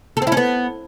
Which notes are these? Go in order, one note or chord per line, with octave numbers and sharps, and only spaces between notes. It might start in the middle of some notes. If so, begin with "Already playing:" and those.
A4
C4
E4
C#4
B3